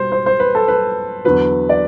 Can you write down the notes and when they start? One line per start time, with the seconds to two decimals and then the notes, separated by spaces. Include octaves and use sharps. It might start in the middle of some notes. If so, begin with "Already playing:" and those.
Already playing: B2 G3 C5
0.12 C5
0.26 C5
0.40 B4
0.55 A4
0.68 B4
1.24 E2 D3 F#3 B3 B4
1.69 D5